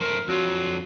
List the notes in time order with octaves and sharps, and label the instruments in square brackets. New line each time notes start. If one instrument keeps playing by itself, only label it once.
[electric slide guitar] F#2 A3 C5 [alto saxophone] A#4
[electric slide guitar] F2 D4 F4 [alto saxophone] F#3